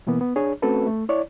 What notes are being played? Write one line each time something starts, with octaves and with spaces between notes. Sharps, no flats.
B2 E3 A#3 B3
B3
D4 G#4 C#5
A3 C4 C#4 F#4 A4 B4
A3
E4 C#5 D5